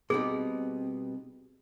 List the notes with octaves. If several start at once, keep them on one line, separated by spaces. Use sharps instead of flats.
B2 G3 C4 D#4 G#4